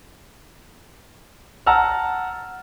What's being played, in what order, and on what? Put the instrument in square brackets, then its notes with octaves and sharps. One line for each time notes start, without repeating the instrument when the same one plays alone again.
[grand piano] F#5 A5 A#5 E6 F6